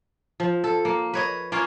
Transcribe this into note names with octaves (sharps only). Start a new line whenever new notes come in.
F3
A4
A#3
B4 C#5 D#5
A#3 C#4 F4 C#5